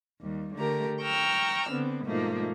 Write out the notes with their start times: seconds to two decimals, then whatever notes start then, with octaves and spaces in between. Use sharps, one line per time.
0.21 D#2 G3
0.55 D3 A3 G4 A#4 A#5
1.01 G5 A#5 C#6 E6 F6
1.71 D3 B3 C4
2.05 G#2 B2 F3 A3 A#3 D#4